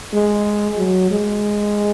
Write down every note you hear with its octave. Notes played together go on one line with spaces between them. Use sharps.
G#3
F#3
G#3